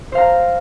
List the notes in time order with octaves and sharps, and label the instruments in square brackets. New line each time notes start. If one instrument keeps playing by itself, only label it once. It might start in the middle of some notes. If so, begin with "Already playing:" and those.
[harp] C5
F5
A#5